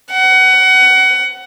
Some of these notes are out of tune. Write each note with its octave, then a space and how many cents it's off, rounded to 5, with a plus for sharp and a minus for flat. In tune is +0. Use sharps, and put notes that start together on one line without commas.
F#5 +20